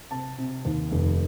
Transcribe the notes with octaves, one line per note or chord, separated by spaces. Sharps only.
C3 A5
C3
D#2
F1